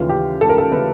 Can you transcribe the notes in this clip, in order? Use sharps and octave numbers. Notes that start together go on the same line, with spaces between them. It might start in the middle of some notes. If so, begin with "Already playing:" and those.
Already playing: D#2 C#3 E3 A3 F4
G4
A4
A#4
A4
C#3 E3 A3 B4